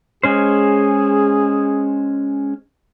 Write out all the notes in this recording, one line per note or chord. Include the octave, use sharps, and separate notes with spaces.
G#3 C#4 G#4 C5